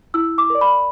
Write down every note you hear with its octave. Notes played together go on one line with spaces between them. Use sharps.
E4 E6
D6
A#4 D5
B5